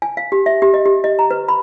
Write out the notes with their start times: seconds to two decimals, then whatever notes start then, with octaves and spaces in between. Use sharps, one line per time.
0.02 G#5
0.17 F5
0.32 G4
0.46 E5
0.62 G4
0.74 D#5
0.86 G4
1.04 D#5
1.19 A#5
1.31 B4
1.48 B5